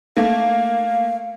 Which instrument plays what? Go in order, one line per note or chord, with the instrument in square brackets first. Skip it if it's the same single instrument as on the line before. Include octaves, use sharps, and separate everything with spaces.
[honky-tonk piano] A3 A#3 [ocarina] F5